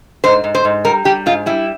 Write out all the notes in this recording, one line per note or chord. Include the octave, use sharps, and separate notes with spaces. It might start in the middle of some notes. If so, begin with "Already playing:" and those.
G#2 C5
G#2
C5
G#2
G3 A#4
G3 G4
G#2 F4
G3 E4